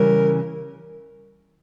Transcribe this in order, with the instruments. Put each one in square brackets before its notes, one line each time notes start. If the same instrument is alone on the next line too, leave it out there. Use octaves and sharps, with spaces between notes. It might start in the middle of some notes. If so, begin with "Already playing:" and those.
Already playing: [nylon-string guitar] C#3 E3 G3 [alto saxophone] A#4